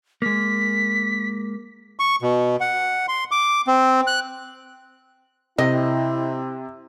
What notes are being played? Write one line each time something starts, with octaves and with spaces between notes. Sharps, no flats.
G#3 A#3 B6
C#6
B2
F#5
C6
D6
C4
F#6
C3 C4 E4 D#5